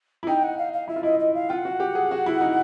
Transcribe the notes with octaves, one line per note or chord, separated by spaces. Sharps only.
E4
D#4 G5
F#5
F5
F5
E4 E5
F4
E4 D#5
D#5
F5
F4 G5
F#5
F#4
G4
G#4
F#4
E4
D#4